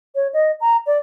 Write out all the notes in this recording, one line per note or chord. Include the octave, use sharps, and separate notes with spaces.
C#5
D#5
A#5
D5